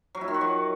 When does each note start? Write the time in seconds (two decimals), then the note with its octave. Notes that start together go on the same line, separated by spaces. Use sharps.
0.15 F#3
0.21 E4
0.28 D#3
0.34 F#4
0.41 F#3